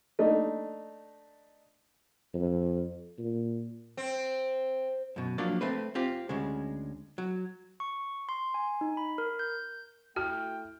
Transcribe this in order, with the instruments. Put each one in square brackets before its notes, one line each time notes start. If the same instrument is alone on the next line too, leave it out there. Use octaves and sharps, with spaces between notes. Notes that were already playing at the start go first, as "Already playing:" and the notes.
[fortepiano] A3 D4 D#4
[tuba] F2
A#2
[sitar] C4
[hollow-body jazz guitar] F#2 B2
F3 F#3 A#3 D4 D5
A3 C4 B4
C4 F4 G4
D2 C#3 G#3
F#3
[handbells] C#6
C6
G#5
D#4
B5
A#4
G6
[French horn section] A3 E4 [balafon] F#4 [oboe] G5 [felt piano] F6